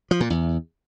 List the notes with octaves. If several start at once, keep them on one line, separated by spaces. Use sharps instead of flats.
F3
A#2
E2